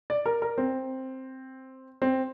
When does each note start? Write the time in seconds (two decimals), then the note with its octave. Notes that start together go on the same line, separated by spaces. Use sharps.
0.10 D5
0.26 A#4
0.42 A#4
0.58 C4
2.02 C4